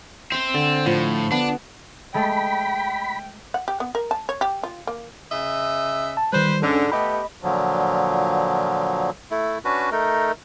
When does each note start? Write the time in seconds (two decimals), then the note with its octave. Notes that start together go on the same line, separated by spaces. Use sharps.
0.32 C4 E5 A#5
0.54 D3
0.86 A2 F3
1.32 B3 D4
2.14 G#3 A3 A4 G5 B5
3.54 F#5
3.68 G4
3.80 B3
3.95 A#4
4.11 A5
4.29 C#5
4.41 G4
4.63 F4
4.87 A#3
5.31 C#3 D#5 E5
6.17 A5
6.33 D#3 G3 B4 C5
6.62 G#2 D3 C#4 D4 A4
6.92 A3 B3 G4 D#5 B5
7.43 A#2 D3 F3 F#3
9.31 A3 E4
9.65 C#4 D4 F#4 B4
9.92 A3 D#4 A#4